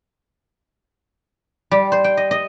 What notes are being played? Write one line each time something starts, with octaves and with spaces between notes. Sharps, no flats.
G3
C5
G5
D#5
D#5